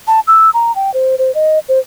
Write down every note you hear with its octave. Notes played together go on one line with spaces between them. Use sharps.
A5
E6
A#5
G5
C5
C5
D#5
C5